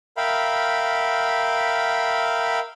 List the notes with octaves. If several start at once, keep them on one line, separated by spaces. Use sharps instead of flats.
A#4 E5 F5 G5 B5